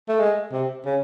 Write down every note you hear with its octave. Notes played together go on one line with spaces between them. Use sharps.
A3
G#3
C3
C#3